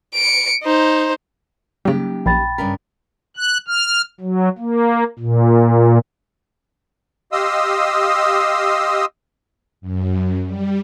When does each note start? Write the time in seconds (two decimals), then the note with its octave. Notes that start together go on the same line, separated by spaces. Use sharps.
0.14 C#7 D7
0.63 D#4 C5
1.85 C#3 F#3 G3 A#3 C#4 D#4 G4
2.26 A#1 G5 B5 A6
2.58 G2 C#3 A#4 B6
3.37 F#6
3.68 F6
4.20 F#3
4.58 A#3
5.19 A#2
7.32 G4 D#5 F5 C6 D#6 E6
9.81 F#2
10.45 G3